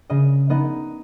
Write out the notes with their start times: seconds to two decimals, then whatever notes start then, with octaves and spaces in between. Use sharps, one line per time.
0.10 C#3 D#5
0.50 B3 D#4 D#5